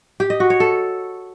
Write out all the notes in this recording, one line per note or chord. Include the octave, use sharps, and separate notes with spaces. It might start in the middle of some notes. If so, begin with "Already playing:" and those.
G4
D#5
F#4
C#5
A4